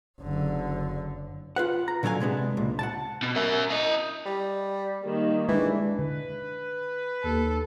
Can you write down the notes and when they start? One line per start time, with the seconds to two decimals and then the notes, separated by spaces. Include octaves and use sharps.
0.20 F#1 D3
1.56 F4 B4 F#5
1.88 A#5
2.03 A#2 D3 F#3 B3 F5 G#5
2.20 C3 G#3 B3 D4
2.57 C#2 A#2
2.79 F#5 G5 A5
3.23 B2
3.36 A#4 E5
3.70 E4 D#5
4.26 G3
5.04 D#3 G3 A#3
5.49 E3 G#3 D4
5.99 D3 B4
7.23 D#2 A4